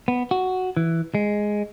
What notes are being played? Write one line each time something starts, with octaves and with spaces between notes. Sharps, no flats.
B3
F#4
E3
G#3